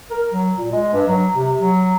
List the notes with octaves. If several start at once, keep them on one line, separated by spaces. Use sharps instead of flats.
A#4
F#3
A#2
G#3
G2
F#3
C3
F#3